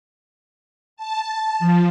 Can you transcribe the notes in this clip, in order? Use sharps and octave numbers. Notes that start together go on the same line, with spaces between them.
A5
F3